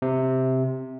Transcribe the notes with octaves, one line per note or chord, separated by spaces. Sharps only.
C3